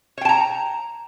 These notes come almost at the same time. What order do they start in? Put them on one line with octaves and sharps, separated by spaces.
C#5 G5 A5 A#5